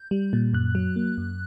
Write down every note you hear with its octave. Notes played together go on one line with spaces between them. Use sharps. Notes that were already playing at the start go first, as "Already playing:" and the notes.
Already playing: G6
G3
A#2
F#2 F#6
F#3
A#3
F#2